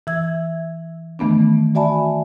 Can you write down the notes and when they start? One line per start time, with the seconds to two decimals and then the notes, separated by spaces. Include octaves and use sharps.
0.07 E3 E5 E6 G#6
1.19 D#3 E3 A3 B3 D4
1.75 F#4 D5 E5 G#5 A5 B5